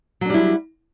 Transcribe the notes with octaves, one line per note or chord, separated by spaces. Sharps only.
F#3 G3 D4 E4